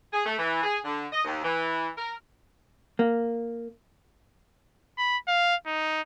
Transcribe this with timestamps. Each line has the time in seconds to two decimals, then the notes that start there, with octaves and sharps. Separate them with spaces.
0.13 G#4
0.26 A3
0.38 E3
0.63 G#4
0.85 D3
1.13 D#5
1.25 D#2
1.44 E3
1.97 A#4
2.99 A#3
4.98 B5
5.28 F5
5.67 D#4